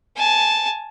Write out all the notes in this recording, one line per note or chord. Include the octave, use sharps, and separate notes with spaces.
G#5 A5